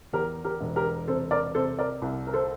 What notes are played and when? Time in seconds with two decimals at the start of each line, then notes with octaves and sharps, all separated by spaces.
0.13 E2 G4 A#4
0.45 G4 A#4
0.60 E1
0.76 G4 A#4
1.07 C3 A4 C5
1.31 A#4 D5
1.55 C3 A4 C5
1.79 A#4 D5
2.02 C2
2.27 A#4
2.34 A4 C5